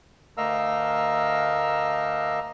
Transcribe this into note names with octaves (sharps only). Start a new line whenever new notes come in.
D2 A3 A#4 D#5 F5 E6